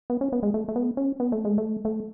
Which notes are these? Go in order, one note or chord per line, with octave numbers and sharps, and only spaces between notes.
B3
C#4
B3
G#3
A3
A3
B3
C#4
B3
A3
G#3
A3
A3